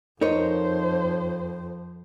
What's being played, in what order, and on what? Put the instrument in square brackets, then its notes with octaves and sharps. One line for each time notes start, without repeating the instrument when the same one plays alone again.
[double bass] F2 [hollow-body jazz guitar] D#4 A#4 C#5 [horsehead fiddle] C5